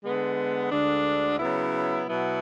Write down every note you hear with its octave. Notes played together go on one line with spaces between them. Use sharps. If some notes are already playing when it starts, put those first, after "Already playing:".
D3 G#3 B3
D2 D3 G#3 D4
C#3 F#3 B3 E4
B2 F#3 B3 E4